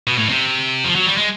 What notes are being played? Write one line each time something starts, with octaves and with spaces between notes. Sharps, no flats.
B2
A2
C3
F3
F#3
G3
G#3